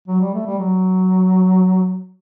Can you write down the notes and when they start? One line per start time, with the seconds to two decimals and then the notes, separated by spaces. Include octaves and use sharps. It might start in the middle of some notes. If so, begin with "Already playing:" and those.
0.08 F#3
0.21 G3
0.33 A3
0.46 G3
0.59 F#3